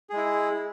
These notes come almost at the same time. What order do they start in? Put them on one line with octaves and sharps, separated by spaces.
G#4 G#3 E4